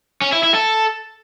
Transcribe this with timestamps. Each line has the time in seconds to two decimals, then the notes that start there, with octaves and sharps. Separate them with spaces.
0.22 C#4
0.32 E4
0.43 E4
0.54 A4